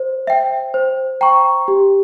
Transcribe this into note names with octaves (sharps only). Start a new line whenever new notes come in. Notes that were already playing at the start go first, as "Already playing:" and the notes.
Already playing: C5
E5 G5
C5
G5 A#5 C#6
G4